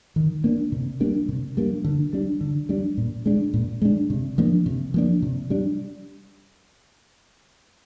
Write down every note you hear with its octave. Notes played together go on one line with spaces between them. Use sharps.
D#3
A#3 D4
C3
G3 A#3 D4
C3
G3 A#3 D4
D3
G3 D4
D3
G3 D4
A#2
G#3 D4
A#2
G#3 D4
C3
F3 A#3 D4
C3
F3 A#3 D4
C3
G3 D4